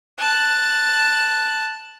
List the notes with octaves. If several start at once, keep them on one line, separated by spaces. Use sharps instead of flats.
A5 F#6